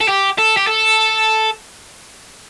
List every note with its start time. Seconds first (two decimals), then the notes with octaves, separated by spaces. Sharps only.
0.01 A4
0.08 G4
0.38 A4
0.57 G4
0.67 A4